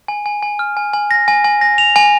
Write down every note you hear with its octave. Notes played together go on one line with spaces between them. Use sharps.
G#5
G#5
G#5
F6
G#5
G#5
A#6
G#5
G#5
A#6
F7
G#5